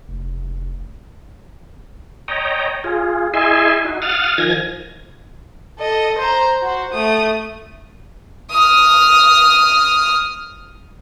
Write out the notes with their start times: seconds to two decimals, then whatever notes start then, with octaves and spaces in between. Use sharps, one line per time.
0.08 F1
2.28 C#5 D#5 G5 A#5
2.84 F4 G#4
3.34 E4 G#4 D#5 E5 G#5 C6
3.85 D#4 F#4
4.02 F5 F#5 D#6 F6 A6
4.38 D#3 F3 G#5 G#6 A#6
5.79 A4 D#5
6.18 C5 A#5
6.62 F#4 C5
6.93 A3 D#6
8.51 D#6 F6